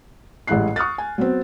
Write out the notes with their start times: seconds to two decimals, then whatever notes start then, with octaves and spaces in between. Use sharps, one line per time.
0.47 A1 G#2 G3 E4 F#6 C7
0.76 C#6 D#6 F6 F#6 A6
0.98 G#5
1.18 F#3 B3 C4